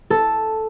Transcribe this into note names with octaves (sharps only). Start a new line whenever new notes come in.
A4